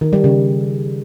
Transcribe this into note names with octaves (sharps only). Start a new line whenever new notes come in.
D#3
G3
C#3